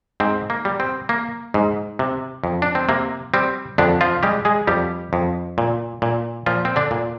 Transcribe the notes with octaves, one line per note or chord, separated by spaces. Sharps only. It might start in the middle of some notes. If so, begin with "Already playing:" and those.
G#2 C4
A#3
G3
C4
A#3
G#2
C3
F2
D4
C4
C3 A#3
G3 C4
F2 D3 D4
F3 F4
G3 G#3 G4
G#3 G#4
F2 G3 G4
F2
A#2
A#2
A#2 F3 F4
C4
D3 D4
A#2